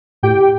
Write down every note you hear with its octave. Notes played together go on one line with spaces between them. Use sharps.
A2 G4 G5